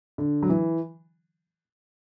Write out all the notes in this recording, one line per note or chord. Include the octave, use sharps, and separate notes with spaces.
D3
F#3
E3